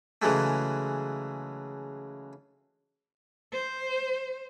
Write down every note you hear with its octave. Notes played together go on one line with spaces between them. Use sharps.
C#3 E3 F#3 G#3 A3
C5